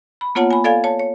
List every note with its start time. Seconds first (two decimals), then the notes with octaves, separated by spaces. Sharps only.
0.21 B5
0.35 A#3 B3 F4 C#5 F#5 A5
0.51 G#5 B5
0.64 A4 D5 F5 G#5 G#6
0.84 C#5 A5
1.00 C#5